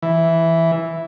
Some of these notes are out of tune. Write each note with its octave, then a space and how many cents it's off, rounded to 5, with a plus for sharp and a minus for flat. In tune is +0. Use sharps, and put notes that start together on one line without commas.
E3 +0